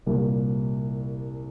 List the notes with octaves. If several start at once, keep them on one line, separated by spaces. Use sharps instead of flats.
C2 A#2 G3 A#3